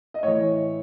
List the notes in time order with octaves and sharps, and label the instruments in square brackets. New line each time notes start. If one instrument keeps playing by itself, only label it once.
[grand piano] D#5
A2 E3 C#5